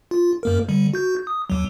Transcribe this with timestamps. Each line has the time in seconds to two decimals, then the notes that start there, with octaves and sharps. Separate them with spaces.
0.11 F4
0.43 F#2 A#3 A#4
0.69 D3 G3
0.93 F#4 G6
1.27 D#6
1.50 D#2 F#3